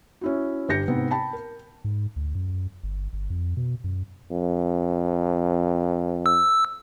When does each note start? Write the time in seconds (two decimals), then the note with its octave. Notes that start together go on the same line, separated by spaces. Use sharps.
0.21 C#4 E4 F#4
0.69 G1 G4 G6 A#6 C#7
0.88 G#2 C3 B3 C4
1.11 G5 A5 B5
1.33 A#4
1.85 G#2
2.16 D2
2.35 F#2
2.83 G1
3.13 G1
3.30 F2
3.57 B2
3.84 F#2
4.31 F2
6.26 E6